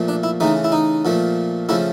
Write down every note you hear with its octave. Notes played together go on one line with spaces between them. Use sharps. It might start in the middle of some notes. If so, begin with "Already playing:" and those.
Already playing: A#2 F3 A3
D4
E4
C#3 E3 A3 D#4
E4
D#4
A#2 F3 A3
C#3 F3 A3 E4